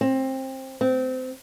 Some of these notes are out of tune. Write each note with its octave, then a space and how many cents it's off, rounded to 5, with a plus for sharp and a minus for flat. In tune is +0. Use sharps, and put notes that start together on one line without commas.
C4 +20
C4 -25